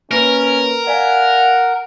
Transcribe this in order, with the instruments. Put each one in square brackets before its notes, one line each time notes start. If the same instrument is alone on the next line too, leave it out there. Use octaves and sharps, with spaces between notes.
[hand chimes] A#3 B4 [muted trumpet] C#4 [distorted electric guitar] A#4
[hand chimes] D5 F5 G#5 [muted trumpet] F#5